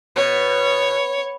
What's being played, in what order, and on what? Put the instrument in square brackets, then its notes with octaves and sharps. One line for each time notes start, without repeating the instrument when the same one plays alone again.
[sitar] B2 [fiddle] C#5